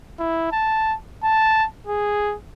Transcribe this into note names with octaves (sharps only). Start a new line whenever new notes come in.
E4
A5
A5
G#4